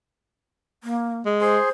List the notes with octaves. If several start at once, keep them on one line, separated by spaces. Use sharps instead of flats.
A#3
G#3
G#4 C5 C6